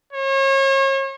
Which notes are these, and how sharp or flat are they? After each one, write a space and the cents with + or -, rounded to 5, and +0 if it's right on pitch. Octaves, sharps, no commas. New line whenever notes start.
C#5 -35